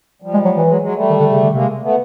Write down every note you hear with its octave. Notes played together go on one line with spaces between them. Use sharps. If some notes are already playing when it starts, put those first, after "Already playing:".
F3 G3
G#3
F#3
E3
F#3 G#3
F#3 G#3
G3 A3
D#3
D3
C#3
D3
C3 G#3 A#3
A3 B3